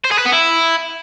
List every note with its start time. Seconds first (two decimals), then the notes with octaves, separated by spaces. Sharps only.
0.04 C5
0.11 G#4
0.18 B4
0.25 B3
0.32 E4